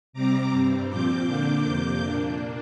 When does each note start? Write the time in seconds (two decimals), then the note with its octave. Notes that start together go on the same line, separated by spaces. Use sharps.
0.13 C3 G3 C4 A#5 D6
0.51 G2 G3 C4
0.89 A#2 F3 C4 D6 G6
1.27 D3 A#3 D4 D6 G6
1.65 F2 C3 A#3 D6 G6
2.03 A#2 A#3 D4